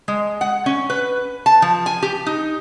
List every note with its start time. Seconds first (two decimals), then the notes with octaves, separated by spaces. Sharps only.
0.08 G#3
0.41 F#5
0.66 C#4
0.90 B4
1.46 A5
1.62 F3
1.86 G#5
2.02 G4
2.26 D#4